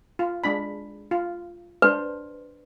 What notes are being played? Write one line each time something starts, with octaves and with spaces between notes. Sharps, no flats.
F4
G#3 D4 B5
F4
D4 B4 C5